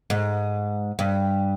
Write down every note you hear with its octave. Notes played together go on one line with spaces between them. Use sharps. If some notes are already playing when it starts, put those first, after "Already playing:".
G#2
G2